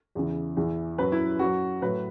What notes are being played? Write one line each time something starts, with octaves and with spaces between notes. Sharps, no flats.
E2 C#3 E3
E2 E3
F#2 F#3 B4
E4
F#2 F#3 F#4
A2 F#3 B4